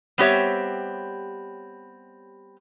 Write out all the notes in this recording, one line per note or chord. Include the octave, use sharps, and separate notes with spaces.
G3 B3 C4 G4 C#5 E5